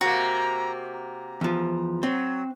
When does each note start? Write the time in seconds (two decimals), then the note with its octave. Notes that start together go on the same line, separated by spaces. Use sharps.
0.01 C3 A#3 F#4 A#5
0.93 A#5
1.41 E2 F3
2.03 F#3 C4